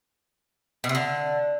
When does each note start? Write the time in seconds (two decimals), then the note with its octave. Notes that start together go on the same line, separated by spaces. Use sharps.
0.84 B2
0.89 C3
0.95 D3